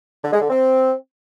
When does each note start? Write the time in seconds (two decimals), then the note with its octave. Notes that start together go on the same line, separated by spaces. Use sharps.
0.24 D3
0.33 G#3
0.41 D3
0.50 C4